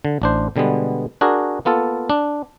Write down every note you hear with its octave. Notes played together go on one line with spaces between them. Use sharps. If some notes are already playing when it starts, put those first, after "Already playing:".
D3
A1 D4 C5
B2 D3 G3 G#3 B3
D4 F#4 G#4 A#4
A#3 B3 F4 A4
D4